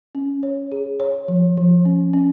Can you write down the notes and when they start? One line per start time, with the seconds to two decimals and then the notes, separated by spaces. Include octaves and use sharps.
0.15 C#4
0.43 C#5
0.72 G#4
1.00 C#5
1.28 F3
1.57 F3
1.85 C#4
2.13 C#4